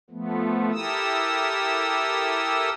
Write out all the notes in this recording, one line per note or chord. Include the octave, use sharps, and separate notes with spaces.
F3 A3 B3
E4 G4 A4 A#4 D#6 E6